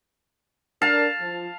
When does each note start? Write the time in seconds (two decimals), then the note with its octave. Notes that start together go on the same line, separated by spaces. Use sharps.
0.82 D4 A#4 F5 A5
1.21 F3